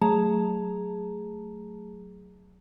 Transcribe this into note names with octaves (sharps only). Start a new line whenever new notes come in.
F#3 A3 G#4 A5 A#5